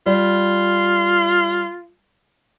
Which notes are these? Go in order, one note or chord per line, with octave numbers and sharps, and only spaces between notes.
G3 F4